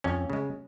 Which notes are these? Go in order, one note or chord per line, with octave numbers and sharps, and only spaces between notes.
F2 C#4
C#3 G#3